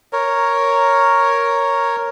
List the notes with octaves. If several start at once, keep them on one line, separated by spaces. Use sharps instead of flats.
A#4 C#5